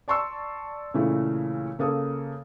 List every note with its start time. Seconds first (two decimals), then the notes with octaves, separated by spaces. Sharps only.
0.08 D5 A5 C6 C#6 E6
0.94 A#2 C#3 E3 A3 E4
1.79 C#3 A#3 A4 D#6